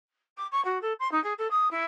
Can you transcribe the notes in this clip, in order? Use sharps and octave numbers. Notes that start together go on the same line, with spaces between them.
D6
C#6
F#4
A4
C6
D#4
G#4
A4
D#6
E4